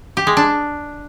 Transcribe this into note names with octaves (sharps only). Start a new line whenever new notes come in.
G4
G#3
D4